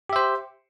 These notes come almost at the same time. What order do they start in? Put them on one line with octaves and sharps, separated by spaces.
G4 E5 C5